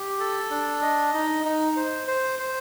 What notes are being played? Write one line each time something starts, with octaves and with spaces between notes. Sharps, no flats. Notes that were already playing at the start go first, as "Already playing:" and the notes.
Already playing: G4
A4
D4
D#5
D#4
D#4
C5
C5
C5